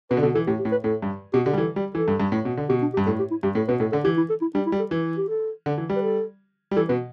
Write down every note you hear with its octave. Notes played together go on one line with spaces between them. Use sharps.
B2 B4
D3
B2 A4
E3 A4
A2 G4
G4
A2
B4
A2 A4
G2
B2 G4
D3 G4
G3
E3 A4
G3
E3 A4
G2
G2
A2
B2
D3
B2 G4
D4
G4
G2
A2 A4
G4
E4
G2 G4
A2 A4
B2 B4
A2 A4
D3 A4
E3 G4
E4
A4
E4
G3 D4
E4
G3
A4
E3 B4
G4
A4
D3
E3
G3
B4
A4
G3
E3 A4
B2 B4